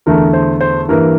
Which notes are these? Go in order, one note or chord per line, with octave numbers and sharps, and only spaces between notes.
E2 D3 A3 A#4
C5
C5
G2 E3 A#3 A#4